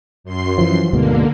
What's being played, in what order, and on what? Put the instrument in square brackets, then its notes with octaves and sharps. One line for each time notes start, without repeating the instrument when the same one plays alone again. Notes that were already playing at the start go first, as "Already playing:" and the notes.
[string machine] F#2 C6 C7
[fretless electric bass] E3 F3
[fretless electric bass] D2 G#2 B2 [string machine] D3 A#3